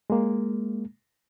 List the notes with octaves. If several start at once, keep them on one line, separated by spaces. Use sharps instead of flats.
G#3 A#3